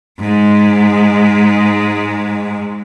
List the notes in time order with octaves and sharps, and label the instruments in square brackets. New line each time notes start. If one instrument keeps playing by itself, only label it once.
[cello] G#2 G#3